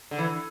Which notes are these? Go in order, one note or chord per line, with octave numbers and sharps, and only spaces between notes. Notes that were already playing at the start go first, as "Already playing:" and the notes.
D3
E3